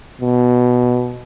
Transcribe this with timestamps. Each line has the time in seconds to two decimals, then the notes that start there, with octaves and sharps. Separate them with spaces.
0.21 B2